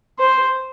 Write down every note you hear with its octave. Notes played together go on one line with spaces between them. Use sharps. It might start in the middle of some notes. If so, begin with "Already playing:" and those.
C5